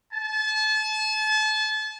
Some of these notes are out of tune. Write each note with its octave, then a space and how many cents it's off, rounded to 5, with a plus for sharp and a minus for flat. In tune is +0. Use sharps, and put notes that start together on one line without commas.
A5 -35